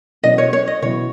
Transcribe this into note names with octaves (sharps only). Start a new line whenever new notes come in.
B2 F#3 C#4 E4 D#5
C#5
C#5
D#5
B2 F#3 C#4 E4 C#5